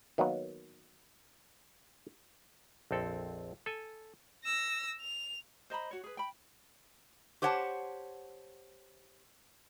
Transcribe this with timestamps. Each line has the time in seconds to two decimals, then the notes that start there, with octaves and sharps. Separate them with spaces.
0.18 D#3 F#3 A#3 B3
2.91 A#1 F2 C4 A4
3.66 A4 G#5
4.44 E6 A#6
5.01 F7
5.70 C5 D#5 A#5 B5
5.91 F#4 C#5
6.04 G#4 B4
6.17 G5 B5
7.42 G4 C5 C#5 F#5 G#5 A5